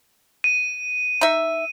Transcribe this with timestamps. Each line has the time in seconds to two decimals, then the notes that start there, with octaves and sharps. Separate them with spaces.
0.44 D#7
1.21 D#4 E5